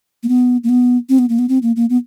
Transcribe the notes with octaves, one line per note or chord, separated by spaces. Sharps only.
A#3
B3
A#3
B3
C4
B3
A#3
B3
C4
A#3
A#3
B3